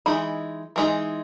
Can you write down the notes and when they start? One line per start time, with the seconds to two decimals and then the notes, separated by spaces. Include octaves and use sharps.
0.06 E3 G#3 D#4 B5
0.76 E3 G#3 D#4